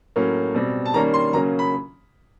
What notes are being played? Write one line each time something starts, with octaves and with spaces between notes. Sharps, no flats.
A2 F#3 A#3 C#4
B2 G3 C4
A5
D#3 G3 A#3 C#4 A#5
C6
C#3 F#3 A#3 C#4 A#5
B5